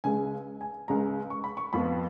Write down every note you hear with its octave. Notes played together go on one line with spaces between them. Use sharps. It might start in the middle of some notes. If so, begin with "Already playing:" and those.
C#2 C#3 G#3 G#5
G#5
C#2 C#3 G#3 A#5
C#6
B5
C#6
F2 F3 B3 B5